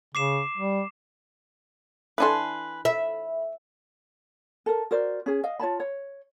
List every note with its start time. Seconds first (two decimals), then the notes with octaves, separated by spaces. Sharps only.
0.15 C#3 D6 C7 E7
0.58 G3
2.18 E3 D4 A4 B4 G#5 C6
2.85 E5 B5
4.66 A4 A#4
4.91 F#4 A#4 C5 D5
5.26 C#4 G#4
5.44 D#5 F5
5.59 F4 C#5 A5 B5
5.80 C#5